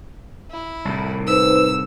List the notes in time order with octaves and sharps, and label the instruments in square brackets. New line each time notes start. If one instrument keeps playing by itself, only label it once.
[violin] E4
[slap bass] C2 A2
[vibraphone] D#4 B4 C5 [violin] E6